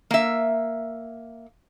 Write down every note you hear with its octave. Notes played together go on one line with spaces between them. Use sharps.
A#3 E5